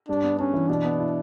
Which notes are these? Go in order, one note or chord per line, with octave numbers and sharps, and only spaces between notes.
G2 D4
B3
C#4 D4
E3
B2 D4
B3
E4